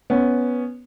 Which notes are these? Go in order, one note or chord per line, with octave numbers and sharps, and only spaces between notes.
B3 C#4